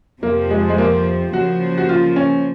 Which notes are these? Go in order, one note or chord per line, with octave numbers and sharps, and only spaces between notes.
F2 C3 F3 A#3
G#3
G#3
A#3
C#3 F3 A#3 F#4
F#4
F4
C#4